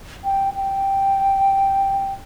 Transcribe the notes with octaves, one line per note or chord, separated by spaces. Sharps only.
G5
G5